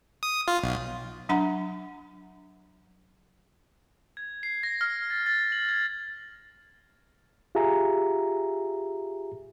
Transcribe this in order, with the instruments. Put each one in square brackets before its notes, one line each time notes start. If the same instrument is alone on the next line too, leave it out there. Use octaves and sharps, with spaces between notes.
[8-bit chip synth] D#6
F4
B1
[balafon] F#3 D4 F#5 A#5 B5
[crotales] G#6
C7
A#6
F6
A6
A6
F#7
G#6
[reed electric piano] F4 G4 G#4 E5 G#5 A#5